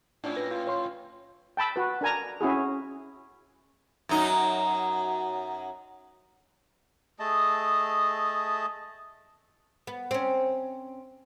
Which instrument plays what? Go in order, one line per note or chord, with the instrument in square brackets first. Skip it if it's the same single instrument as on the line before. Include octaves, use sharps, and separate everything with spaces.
[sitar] A2 C#4 E4 [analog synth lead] D4
[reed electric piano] B4 [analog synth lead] A#6
[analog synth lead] F4
[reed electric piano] C#5 C6
[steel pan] G5 A5 B5 E6
F#4 B4
D4 A#4 G#5 A#5
C#4 E4 F#4 G#4
[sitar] F#2 F#3 D#4
[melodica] A3 G#4 D#5 A5
[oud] B3
C4 C#4